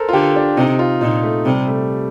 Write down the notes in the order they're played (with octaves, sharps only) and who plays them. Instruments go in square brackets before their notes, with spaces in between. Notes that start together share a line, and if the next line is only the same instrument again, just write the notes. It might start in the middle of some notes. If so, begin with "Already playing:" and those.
Already playing: [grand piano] A4 A#4 C5
F4
[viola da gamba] D3 [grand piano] G4
[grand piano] D4
[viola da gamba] C3 [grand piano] D#4
[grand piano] F4
[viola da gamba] A#2 [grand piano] D#4
[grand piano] A3
[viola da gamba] C3 [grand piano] G3
[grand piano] A3